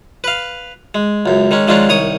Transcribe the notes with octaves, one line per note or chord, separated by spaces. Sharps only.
B4 F5
G#3
C#2 F#2
D#3 G#3 C#4
D#3 F3 G#3 C#4 D4 F4
C2 D#3 C#5 D#6